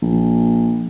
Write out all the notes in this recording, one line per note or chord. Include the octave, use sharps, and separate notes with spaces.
A#1